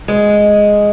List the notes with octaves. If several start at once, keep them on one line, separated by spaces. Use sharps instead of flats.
G#3